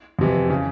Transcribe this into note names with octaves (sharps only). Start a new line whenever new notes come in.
F2 C3 E3
C#3